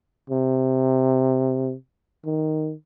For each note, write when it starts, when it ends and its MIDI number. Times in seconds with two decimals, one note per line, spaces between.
0.30 1.74 48
2.25 2.73 51